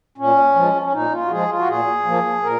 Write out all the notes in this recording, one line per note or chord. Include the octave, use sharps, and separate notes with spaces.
A#2 C#4
F3 G#3
C#4
A#2 D#4
F4
F#4
F3 G#3 G#4
F4
F#4
A#2 G#4
F3 A#3
A#2 A#4